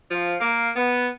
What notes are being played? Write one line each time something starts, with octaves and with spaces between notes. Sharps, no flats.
F3
A#3
B3